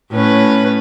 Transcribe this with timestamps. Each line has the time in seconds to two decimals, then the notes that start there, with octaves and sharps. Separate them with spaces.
0.11 A2 C#4 B4